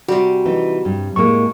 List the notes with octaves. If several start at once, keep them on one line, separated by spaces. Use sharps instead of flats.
C3 G3 F#4
E3 D#4
G2
A2 G#3 A#3 C#6